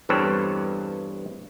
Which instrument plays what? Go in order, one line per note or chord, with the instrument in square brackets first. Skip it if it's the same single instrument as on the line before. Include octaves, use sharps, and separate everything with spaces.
[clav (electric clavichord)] E2 G2 C4 A4 B4 C#5